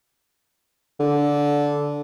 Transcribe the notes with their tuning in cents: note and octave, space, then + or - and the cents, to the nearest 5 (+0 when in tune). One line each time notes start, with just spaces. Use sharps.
D3 -10